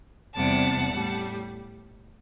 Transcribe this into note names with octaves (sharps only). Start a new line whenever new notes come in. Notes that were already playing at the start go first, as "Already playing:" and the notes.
E2 C3 G3 F#5 A5
A2 G3